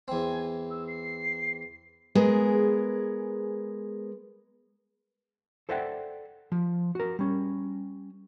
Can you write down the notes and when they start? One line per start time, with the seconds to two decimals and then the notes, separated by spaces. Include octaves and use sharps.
0.08 E2 C4 G#5
0.70 E6
0.87 C7
2.15 G#3 B3 G#4 A#4
5.69 A4 C5 D5 E5 F#5 G5
6.52 F3
6.95 F#4 A#4
7.19 G3 C#4